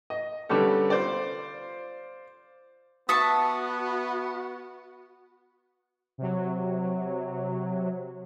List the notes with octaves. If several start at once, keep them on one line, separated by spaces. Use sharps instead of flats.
D#5
D3 G3 B3 C#4 G4 A4
F4 C5 D5
B3 F#4 E5 A5 C#6 D#6
C3 F#3